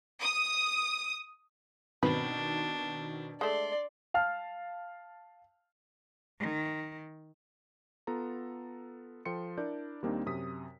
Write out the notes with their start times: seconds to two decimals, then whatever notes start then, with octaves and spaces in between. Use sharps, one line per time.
0.23 D#6
2.03 B2 D#3 C4 D4 B4
3.41 G#3 A3 D5 C6
4.14 F5 A5 F6
6.40 D#3
8.07 B3 F4 A4 A#5
9.25 F3 A4 G5 C6 C#7
9.58 D4 E4 A#4 D5 G6
10.02 D#2 G3 A#3 C4 D4 D#4
10.26 F#2 C3 D#6 B6